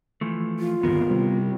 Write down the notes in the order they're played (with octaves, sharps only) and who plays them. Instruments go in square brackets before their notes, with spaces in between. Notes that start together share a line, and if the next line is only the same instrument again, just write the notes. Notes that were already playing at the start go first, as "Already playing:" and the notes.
[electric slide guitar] E3 F3 A3
[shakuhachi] F4
[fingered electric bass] D1 G1 D#2 [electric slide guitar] B3 A#4
[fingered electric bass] C3 G3